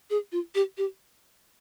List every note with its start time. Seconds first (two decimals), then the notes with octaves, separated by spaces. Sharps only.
0.10 G#4
0.32 F4
0.55 G4
0.77 G4